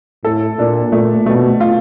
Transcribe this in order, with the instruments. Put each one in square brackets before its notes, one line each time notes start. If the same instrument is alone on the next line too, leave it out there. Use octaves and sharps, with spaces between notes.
[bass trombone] A2 [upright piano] A4
[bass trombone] A#2 [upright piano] D4
[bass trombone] A#2 [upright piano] A3
[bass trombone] B2 [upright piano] A3
[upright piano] F4